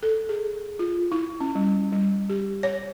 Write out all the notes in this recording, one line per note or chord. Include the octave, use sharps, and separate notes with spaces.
A4
G#4
F4
E4
C#4
G3
G3
G4
C#5